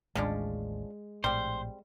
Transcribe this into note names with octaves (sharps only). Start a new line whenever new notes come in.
A1 D#2 A2 F3 G#3 C#4 D4
A#1 A2 G3 C4 C5